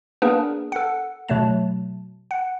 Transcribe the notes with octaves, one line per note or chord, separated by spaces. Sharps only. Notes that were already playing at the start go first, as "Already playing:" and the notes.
A#3 B3 D4 G#4 A#4 B4
A4 F#5
B2 F#3 A3 A5
F#5